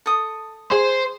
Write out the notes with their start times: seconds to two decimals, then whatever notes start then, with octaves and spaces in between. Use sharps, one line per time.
0.06 A4 D#6
0.71 G#4 C5